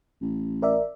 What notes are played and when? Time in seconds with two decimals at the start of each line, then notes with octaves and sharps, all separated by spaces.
0.21 A1
0.62 A#4 D5 E5